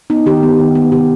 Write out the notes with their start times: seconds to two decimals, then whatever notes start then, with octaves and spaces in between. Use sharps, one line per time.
0.10 B3 D#4
0.26 D#3 G4
0.43 B3
0.59 D#3
0.75 B3
0.92 C3 G4